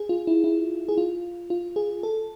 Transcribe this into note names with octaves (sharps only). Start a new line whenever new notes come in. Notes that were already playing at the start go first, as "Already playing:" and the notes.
Already playing: G#4
F4
E4
E4
G#4
F4
F4
G#4
A4